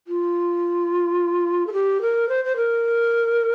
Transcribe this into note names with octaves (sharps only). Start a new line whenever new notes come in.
F4
A4
G4
A#4
C5
C5
A#4